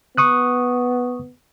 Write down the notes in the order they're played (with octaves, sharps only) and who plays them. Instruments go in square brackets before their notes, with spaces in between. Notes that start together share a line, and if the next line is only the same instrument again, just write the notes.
[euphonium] B3 [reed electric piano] C#6 D#6 F#6